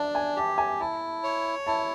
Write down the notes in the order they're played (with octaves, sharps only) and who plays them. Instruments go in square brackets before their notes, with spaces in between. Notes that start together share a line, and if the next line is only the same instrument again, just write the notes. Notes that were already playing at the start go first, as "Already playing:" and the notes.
Already playing: [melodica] D4 [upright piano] A5
[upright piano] G#5
[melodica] G4 [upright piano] A5
[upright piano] G#5
[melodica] E4 [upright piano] A5
[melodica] C#5
[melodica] E4 [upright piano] A5